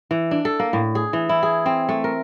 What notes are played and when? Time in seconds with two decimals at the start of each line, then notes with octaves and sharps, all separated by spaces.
0.11 E3
0.31 D4
0.45 A4
0.60 A#3
0.73 A2
0.95 G#4
1.13 E3
1.29 E4
1.43 G#4
1.66 C4
1.89 A3
2.04 A#4